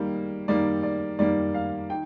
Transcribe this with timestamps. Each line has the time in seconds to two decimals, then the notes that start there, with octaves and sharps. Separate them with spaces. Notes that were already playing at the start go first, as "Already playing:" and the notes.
Already playing: D#3 G3 A#3
0.48 D#3 G3 A#3 D5
0.83 D5
1.19 D#3 G3 A#3 D5
1.54 F5
1.90 D#3 G5